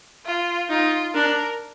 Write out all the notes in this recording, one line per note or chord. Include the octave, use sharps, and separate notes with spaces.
F4
D#4 F4
D4 A#4